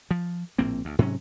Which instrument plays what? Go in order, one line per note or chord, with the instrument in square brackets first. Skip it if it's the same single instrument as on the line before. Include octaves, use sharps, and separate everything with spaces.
[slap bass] F3
A#1 A2 A#3 C4
D2
G#2 C3 F#3 C#4